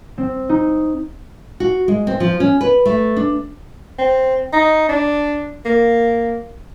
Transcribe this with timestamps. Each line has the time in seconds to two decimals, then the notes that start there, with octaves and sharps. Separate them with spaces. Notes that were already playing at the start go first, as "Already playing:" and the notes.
0.18 C4
0.49 D#4
1.60 F#4
1.88 G#3
2.07 C4
2.20 F3
2.40 C#4
2.61 B4
2.85 A3
3.17 D4
3.98 C4
4.53 D#4
4.89 D4
5.65 A#3